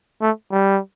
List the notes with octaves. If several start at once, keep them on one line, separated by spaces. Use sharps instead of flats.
A3
G3